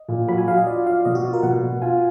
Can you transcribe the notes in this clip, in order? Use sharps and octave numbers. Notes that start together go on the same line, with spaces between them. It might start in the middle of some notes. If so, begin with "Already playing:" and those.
Already playing: D#5
A#2
F#3 B5
G#5
F#3 F5
D#5
F4 D5
F4 F5
B2 D#5
F#4
F4
A#4
B2 F#5
B2
F4 G#5